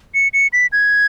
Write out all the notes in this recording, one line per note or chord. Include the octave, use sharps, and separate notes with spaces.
C#7
C#7
B6
G#6